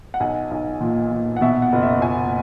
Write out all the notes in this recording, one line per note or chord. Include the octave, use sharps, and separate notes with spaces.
F#5
B1 G#5
B1
A#2
A#2
F#5
B2 E5
F#5
F#1
E5
F#1 G#5